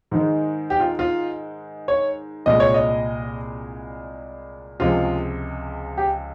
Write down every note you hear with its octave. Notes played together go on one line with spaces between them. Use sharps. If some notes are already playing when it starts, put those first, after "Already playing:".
G#2 D#3 G#3
G4
F4
F4
C#5
C2 A#2 G#3 D#5
C#5
D#5
C#2 C3 F3 G#3 F4
G4